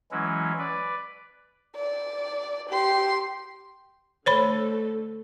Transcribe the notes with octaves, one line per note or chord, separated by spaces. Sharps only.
E3 F#3 G#3 C#4 E4
B4 D5
D5
G4 C6
D3 A3 A4 C5 C#5 B5